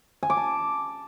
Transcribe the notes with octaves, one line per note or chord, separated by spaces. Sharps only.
G#5
D6
A5